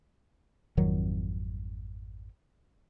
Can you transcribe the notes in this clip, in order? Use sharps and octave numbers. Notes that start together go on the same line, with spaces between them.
G#1 F2 D#3 F#3